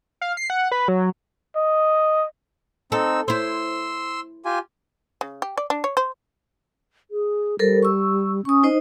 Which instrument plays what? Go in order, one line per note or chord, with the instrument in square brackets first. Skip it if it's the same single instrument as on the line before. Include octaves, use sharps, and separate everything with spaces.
[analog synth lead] F5
C7
F#5
B4
F#3
[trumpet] D#5
[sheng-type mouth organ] C4 D#4 E6 [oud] A4
[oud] E4 C5 [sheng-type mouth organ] C6 E6
[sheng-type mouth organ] F4 G4 G#5
[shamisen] C#3
G4
D5
D4
C#5
C5
[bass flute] G#4
[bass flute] G3 [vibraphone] A4 A#4 C5
[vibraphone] C#6 E6
[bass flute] C#4 [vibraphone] C#6 D#6
[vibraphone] D#4 C5 D#5